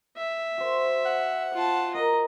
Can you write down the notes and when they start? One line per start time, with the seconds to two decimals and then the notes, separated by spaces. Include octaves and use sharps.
0.17 E5
0.58 F#4 C5
1.06 F#5
1.54 F4 A5
1.94 A#4 D#5